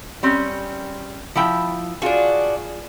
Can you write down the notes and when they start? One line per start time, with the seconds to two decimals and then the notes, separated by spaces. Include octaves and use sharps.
0.23 G3 C4 C#4
1.35 F3 E4 G5
2.02 D4 F4 F#4 G#4